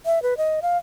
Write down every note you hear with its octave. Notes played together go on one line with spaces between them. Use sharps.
E5
B4
D#5
F5